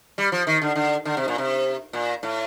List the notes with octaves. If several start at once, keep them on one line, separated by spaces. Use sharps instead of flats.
G3
F3
D#3
D3
D3
D3
C3
A#2
C3
A#2
A2